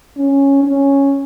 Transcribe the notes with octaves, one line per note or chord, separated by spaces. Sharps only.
C#4
C#4